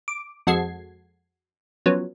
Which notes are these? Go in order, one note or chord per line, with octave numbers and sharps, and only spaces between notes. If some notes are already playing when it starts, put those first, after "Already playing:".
D6
F2 G#3 F#4 A4 G#6 C7
F3 F#3 B3 C#4